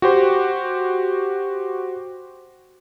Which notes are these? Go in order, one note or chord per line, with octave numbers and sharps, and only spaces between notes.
F#4 G4 C5